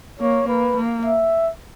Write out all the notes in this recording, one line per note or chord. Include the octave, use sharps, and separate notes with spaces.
A#3 C#5
A#3 B4
A#3
E5